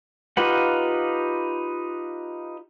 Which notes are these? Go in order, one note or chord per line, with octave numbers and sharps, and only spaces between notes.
D#4 F4 G4 B4 F#5